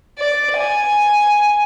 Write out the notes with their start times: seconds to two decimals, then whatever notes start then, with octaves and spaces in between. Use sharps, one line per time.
0.19 D5
0.57 G#5